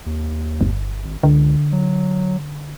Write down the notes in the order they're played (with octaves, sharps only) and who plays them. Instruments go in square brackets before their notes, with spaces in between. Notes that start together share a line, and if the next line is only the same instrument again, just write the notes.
[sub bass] D#2
[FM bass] G1
[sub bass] G#1
[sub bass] C#2 [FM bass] D3
[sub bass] F#3